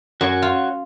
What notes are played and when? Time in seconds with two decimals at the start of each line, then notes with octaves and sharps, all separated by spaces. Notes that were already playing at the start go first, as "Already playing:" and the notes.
0.21 F#2 F#4 C#5
0.42 F4